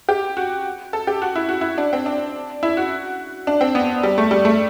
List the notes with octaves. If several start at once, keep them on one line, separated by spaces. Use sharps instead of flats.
G4
F#4
A4
G4
F#4
E4
F#4
E4
D4
C4
D4
E4
F#4
D4
C4
B3
G3
A3
G3
A3